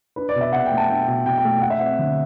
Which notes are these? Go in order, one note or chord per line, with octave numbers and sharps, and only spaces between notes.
D4 B4
D5
B2
E5
B2 F#5
G5
A3
A5
D4 G5
B2
B2 G5
G5
A3
A3 F#5
E5
C4 F#5
D3